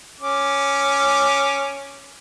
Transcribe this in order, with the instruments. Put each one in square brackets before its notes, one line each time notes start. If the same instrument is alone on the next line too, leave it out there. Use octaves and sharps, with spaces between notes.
[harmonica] C#4 D6